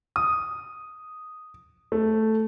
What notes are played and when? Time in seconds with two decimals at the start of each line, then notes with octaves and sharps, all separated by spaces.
0.16 D#6
1.92 A3